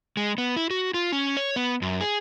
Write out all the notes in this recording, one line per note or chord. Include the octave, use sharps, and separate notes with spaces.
G#3
B3
E4
F#4
F4
C#4
C#5
B3
F#2
G#4